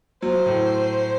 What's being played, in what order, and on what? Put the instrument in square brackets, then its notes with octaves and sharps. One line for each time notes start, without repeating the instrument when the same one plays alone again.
[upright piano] F#3 [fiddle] C5
[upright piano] A2